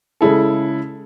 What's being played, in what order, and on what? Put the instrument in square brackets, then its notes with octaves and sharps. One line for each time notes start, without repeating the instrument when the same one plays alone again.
[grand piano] C#3 G#3 E4 A4